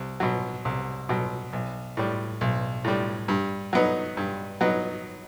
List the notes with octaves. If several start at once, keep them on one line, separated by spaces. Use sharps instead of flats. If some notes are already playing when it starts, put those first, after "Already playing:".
Already playing: C2
B2 F#3
C2
B2 F#3
B1
A2 G3
B1
A2 G3
G2
F#3 B3 D#4
G2
F#3 B3 D#4